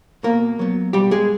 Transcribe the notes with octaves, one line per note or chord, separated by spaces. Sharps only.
B2 A#3 A#4
F#3 B3
B2 G3 G4
G#3 G#4